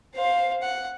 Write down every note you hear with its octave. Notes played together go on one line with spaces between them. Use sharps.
C5 F5
F#5